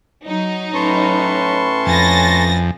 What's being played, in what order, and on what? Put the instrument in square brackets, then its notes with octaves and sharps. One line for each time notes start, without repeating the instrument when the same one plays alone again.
[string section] F#3 D#4
[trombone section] A2 C#4 B4 [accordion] A5 C6 C#6
[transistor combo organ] F2 [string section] G#5 A6 A#6